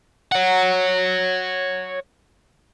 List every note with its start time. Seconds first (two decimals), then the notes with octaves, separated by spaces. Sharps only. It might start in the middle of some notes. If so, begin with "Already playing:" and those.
0.32 C#5 F#5